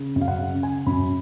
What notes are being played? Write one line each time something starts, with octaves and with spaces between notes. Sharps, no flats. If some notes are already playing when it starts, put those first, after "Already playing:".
Already playing: C#3
F#2
F5
F#5
C#3
C#3 G#5
F#2 B5